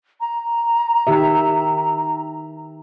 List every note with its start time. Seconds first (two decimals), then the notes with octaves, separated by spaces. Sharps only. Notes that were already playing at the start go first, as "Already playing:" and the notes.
0.21 A#5
1.07 D#3 G4 E5